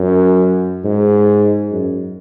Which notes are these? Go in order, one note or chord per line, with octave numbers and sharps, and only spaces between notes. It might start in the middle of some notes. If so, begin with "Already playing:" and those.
Already playing: F#2
G#2
F#2